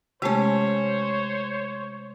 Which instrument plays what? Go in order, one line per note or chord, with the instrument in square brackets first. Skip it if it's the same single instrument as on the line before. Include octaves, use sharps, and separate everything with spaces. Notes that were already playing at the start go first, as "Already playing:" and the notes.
[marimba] C3 G#3 A3 [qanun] C#4 G4 [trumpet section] C5 C#5